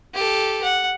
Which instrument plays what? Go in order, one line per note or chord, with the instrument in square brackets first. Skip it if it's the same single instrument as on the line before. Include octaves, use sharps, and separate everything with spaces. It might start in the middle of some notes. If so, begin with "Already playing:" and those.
[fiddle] G4 A4
F#5